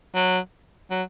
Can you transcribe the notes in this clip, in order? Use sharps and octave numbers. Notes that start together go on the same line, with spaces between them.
F#3
F#3